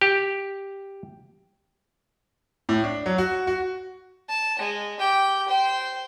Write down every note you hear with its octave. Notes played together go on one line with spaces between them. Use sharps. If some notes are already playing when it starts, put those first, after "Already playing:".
G4
A2
D4
F#3
F#4
F#4
A5
G#3
G4 G5
C5 G5